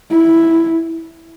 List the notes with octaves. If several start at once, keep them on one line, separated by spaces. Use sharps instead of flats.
E4